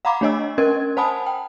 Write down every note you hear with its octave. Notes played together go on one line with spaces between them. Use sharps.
F5 F#5 A#5 B5 D6
A3 D4 C#5 D#5 E6
C#4 A#4 D#5 G#6
C5 F#5 G#5 A5 B5 D#6
G5